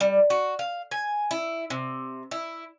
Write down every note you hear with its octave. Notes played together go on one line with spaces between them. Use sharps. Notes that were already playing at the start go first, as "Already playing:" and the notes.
G3
F#4
F5
G#5
E4
C3
E4